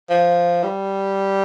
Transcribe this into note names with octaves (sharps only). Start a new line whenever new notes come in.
F3
G3